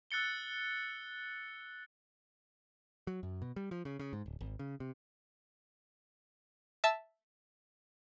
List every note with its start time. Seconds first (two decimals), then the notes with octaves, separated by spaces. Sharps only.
0.11 E6 F#6 A6 C#7 G7
3.07 F#3
3.23 F#2
3.42 B2
3.56 G3
3.71 F3
3.85 C#3
3.99 C#3
4.13 G#2
4.26 D1
4.41 G#1
4.59 C#3
4.80 C3
6.84 E5 A5 E6